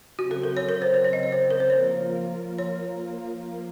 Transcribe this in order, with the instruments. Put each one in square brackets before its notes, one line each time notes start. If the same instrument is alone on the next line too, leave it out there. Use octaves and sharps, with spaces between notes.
[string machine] C#3 F#3 C4 [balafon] F#4
[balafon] A4
A#4
C#5
A#4
C5
C#5
C#5
D#5
C#5
C5
A#4
C5
[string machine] F3 A#3 F4 A#4 [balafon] C#5
[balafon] C#5